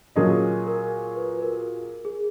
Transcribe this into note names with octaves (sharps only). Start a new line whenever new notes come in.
A#2 F#3 C#4 G#4 A#4 D#5
A#4
B4
B4
A#4
G#4